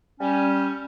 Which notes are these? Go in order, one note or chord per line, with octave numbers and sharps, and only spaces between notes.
G3 C#4